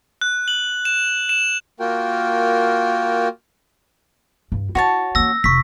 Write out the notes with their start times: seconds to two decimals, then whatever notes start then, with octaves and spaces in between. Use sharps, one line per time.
0.21 F#6
0.48 F#7
0.85 E7
1.29 E7
1.80 A#3 F4 F#4 A#4 G5
4.52 G2
4.75 E4 F#4 C#5 A5
5.15 A#3 C#4 E6 A#6
5.44 F1 C#6 B6